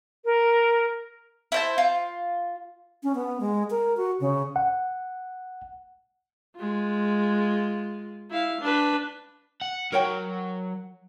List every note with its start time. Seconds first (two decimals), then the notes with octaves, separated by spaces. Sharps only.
0.25 A#4
1.52 E4 C5 A5
1.78 F4
3.03 C#4
3.15 B3
3.40 G#3
3.70 A#4
3.97 F#4
4.20 C#3
4.56 F#5
6.55 G#3 F4
8.31 E4 F5
8.61 D4 B4
9.62 F#5
9.92 F#3 A#4 C#5 G5